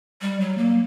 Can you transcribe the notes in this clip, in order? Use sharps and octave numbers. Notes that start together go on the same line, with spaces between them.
G3
F#3
A#3